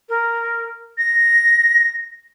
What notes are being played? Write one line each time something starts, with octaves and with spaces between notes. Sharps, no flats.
A#4
A#6